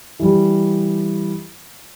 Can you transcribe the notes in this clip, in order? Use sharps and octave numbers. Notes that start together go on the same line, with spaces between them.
E3 G3